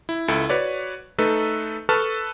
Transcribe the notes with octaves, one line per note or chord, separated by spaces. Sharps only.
E4
C#2 E4 A4
F#4 B4 C#5 D5
A3 D#4 A4 B4
A4 B4 A5 C#6 F6